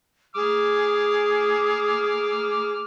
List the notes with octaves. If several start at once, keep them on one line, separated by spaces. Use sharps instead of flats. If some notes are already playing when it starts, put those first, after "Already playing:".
G#4 D6 F6